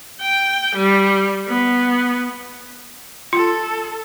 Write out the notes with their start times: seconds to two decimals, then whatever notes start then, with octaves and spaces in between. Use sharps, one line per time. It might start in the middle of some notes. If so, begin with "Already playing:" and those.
0.21 G5
0.76 G3
1.48 B3
3.33 F4 A4